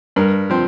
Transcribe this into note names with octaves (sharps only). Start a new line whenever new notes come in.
G2 A#4
F3 C4